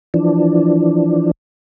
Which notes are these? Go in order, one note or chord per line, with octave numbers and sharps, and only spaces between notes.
E3 F3 D4